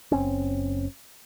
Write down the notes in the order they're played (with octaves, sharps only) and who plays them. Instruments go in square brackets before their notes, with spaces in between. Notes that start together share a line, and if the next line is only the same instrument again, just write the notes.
[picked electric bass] F#1 C4 C#4